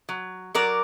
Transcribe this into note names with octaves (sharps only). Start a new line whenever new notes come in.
F#3
F#3 A#4 D5